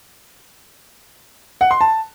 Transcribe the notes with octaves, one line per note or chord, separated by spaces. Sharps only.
F#5
C6
A5